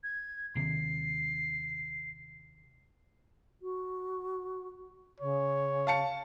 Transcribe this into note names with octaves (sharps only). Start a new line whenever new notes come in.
G#6
D#2 C3 D#3 C7
F#4
C#3 C#5
F5 A5 C#7